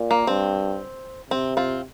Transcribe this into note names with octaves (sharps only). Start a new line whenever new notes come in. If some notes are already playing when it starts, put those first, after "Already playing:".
Already playing: A#2
A#3
G2 C4
C3 C4
C4 F4